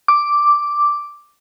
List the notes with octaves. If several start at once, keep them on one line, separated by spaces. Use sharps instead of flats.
D6